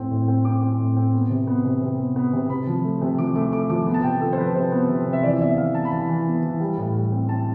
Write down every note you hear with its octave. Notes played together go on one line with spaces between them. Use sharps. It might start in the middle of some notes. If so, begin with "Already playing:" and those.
Already playing: A2 C4
A2
C4
C4 D6
C4
A2
C4
B3
C3
B3
C3
C3
B3
B3
C3
C3 B5
F3
A3
C3
F3 D6
A3 D6
A3 D6
F3 D6
B3
A5
C3 G5
F3 A4
C5
F3 B4
C3 C5
B3
C3
C3
E5
E3 D5
B3 E5
E3 F5
B3 A5
B5
E3 A5
E3
B3
E3
G3
A2
G3
C4
C4 A5